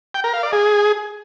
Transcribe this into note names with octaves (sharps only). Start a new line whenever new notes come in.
G5
A#4
F5
D5
G#4